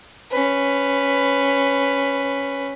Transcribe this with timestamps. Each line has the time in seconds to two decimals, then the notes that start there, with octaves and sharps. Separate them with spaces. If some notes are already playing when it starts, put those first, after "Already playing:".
0.31 C#4 B4